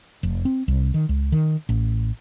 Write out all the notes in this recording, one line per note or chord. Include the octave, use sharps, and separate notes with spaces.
F1
C4
C2
D#3
C#2
D#3
A1